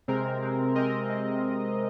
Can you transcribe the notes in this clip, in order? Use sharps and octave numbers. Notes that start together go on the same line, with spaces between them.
C3 G#3 C4 A#4
C3 G#3 C4
C3 G#3 C4 A#4 D#5
A#4
C3 G#3 C4